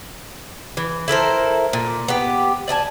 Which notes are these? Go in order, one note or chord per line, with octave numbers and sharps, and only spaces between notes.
E3
E4 A4 A#4 C5
A#2
B3 G4
D5 D#5 G#5 A5